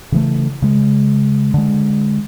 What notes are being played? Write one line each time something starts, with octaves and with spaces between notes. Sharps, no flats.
C#3 E3 A3
C#3 G#3
D3 G#3